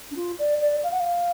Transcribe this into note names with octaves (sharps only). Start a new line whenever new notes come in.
D4
F4
D5
D5
F5
F#5
F5